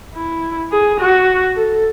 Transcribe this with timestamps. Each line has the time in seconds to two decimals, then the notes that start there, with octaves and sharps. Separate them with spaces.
0.15 E4
0.72 G#4
1.00 F#4
1.56 A4